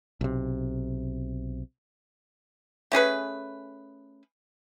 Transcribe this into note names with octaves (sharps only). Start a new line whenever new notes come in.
B1 C3
A3 C#4 G#4 B4